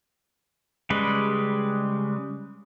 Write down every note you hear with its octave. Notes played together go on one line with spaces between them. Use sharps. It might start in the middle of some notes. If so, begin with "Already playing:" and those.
C#3 G3 G#3 B4